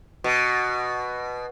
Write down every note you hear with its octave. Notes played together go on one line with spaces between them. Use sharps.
B2